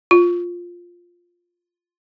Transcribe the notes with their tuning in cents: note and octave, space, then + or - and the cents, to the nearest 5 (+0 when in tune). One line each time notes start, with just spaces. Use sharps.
F4 +5